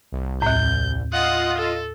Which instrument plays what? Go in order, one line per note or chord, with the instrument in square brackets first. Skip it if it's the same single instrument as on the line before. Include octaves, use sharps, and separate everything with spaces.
[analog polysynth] C2
[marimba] D#2 A2 [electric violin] G6
[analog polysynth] F4 D#5 [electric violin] F#5 D#6
[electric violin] A4